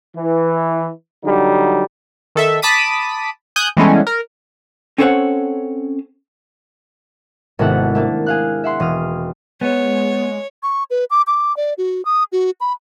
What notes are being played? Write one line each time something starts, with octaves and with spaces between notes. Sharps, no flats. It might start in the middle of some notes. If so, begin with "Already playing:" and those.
E3
D3 F#3 G3 D#4
D#3 A4 E5
A5 B5 D6 D#6 B6 D#7
G#5 D#6 F#6 G6
E3 G3 G#3 B3 C#4 A4
A#4
C4 C#4 A4 C5 C#5 F#5
G#1 C3 B3 E4 A4 F#5
A3 A#3 D4
G#4 F5 F#6
E5 F#5 C6
E1 D#6 F6
G#3 B3 C#5
C#6
B4
D6
D6
D5
F#4
D#6
F#4
B5